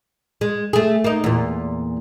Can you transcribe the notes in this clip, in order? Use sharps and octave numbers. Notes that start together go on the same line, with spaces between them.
G#3
A3 G#4
A#3 D#4
E2 A#2